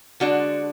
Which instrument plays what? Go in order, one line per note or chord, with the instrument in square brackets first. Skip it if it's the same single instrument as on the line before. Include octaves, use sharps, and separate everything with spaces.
[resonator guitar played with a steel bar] D3 G#3 D4 F#4